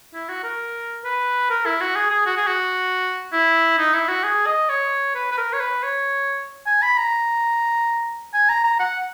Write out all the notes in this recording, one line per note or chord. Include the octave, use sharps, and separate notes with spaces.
E4
F#4
A#4
B4
A#4
E4
F#4
G#4
G#4
F#4
G#4
F#4
E4
D#4
E4
F#4
G#4
D#5
C#5
B4
B4
A#4
C#5
B4
C#5
G#5
B5
A#5
G#5
A#5
A#5
F#5